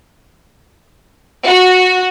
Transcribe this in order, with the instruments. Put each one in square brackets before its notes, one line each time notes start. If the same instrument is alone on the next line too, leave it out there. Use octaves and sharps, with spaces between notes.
[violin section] F#4